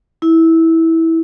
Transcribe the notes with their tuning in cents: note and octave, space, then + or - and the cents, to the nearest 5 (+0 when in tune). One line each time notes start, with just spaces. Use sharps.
E4 -15